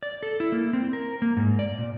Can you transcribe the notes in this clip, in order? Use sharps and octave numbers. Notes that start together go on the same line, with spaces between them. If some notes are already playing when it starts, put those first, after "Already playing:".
D5
A4
E4
A#3
C4
A#4
A#3
G#2
D5
A#2